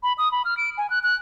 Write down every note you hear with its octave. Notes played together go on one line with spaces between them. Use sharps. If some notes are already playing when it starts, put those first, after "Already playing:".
B5
D#6
B5
F6
D7
G#5
F#6
F#6